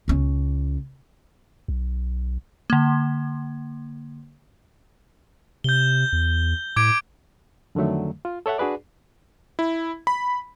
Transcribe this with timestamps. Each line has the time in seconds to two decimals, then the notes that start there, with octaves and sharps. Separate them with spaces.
0.08 C#2 C#4
1.68 B1
2.70 D3 A#3
5.64 C3 G6 G7
6.13 E2
6.76 A2 D6 G#6 D7
7.75 F2 D3 D#3 F#3 A3
8.25 F4
8.46 A4 C#5 E5 F#5
8.58 D4 F#4 G#4 B4 D5
9.59 E4
10.07 B5